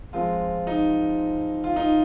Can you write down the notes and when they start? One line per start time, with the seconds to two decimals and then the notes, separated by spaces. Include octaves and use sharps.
0.13 F3 G#3 C4 F4
0.67 D#4
1.64 F4
1.76 D#4